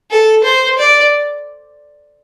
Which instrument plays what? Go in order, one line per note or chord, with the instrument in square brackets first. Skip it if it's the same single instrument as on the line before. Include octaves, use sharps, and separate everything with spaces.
[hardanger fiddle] A4
C5
D5